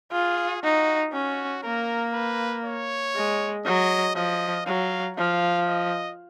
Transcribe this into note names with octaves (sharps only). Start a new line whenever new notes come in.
F4 G#4
D#4 F#4
C#4 F#4
A#3 A#4
B4
C#5
G#3
F#3 D#5
F3 D#5
F#3 F5
F3 F5
D#5